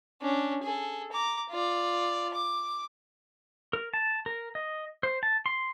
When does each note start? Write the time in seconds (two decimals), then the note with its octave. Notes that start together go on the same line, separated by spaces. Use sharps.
0.21 C#4 D4
0.63 G#4 A4
1.12 A#5 D6
1.50 F4 D5
2.34 D6
3.73 A#4
3.94 A5
4.26 A#4
4.55 D#5
5.03 C5
5.23 A5
5.46 C6